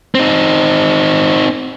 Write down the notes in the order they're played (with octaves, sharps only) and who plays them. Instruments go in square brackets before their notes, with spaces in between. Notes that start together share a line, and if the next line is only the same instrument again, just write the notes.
[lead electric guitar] C4 D#4